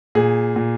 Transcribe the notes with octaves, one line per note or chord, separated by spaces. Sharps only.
A#2 G#4
A#2